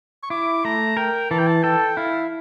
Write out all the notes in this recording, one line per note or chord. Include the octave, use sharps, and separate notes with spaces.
C#6
E4 D6
A3 A#5
A#4 G5
E3 A5
G5
A5
A4 G5
E4 F5